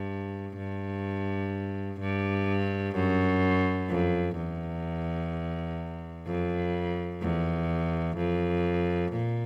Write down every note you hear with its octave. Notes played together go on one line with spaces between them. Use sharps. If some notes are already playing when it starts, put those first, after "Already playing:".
Already playing: G2
G2
G2
F#2
F2
E2
F2
E2
F2
A#2